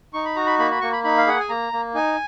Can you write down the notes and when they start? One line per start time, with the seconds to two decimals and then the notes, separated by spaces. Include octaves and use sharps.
0.14 D#4 C#6
0.25 B5
0.36 F#4 A#5
0.46 B5
0.59 A#3 B5
0.71 B5
0.81 A#3 C#6
0.92 B5
1.04 D#4 B5
1.18 F5
1.27 G#4 F#5
1.39 G#5
1.49 A#3 A#5
1.73 A#3
1.95 D#4 G#5